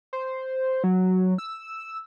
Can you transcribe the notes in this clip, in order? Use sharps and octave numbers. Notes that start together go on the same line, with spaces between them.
C5
F#3
E6